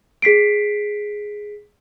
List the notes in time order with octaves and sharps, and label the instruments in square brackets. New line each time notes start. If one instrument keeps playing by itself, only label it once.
[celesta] G#4 B6 C7 D7